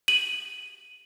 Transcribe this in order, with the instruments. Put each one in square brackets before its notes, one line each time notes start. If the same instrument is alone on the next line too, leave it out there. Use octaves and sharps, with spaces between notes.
[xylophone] D#7 F#7